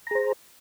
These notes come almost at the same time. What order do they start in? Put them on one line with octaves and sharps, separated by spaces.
A#5 G#4 C5